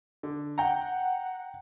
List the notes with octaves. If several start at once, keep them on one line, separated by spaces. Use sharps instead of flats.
D3
F#5 G5 A#5